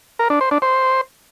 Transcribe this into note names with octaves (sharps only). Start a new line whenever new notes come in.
A#4
D4
C5
D4
C5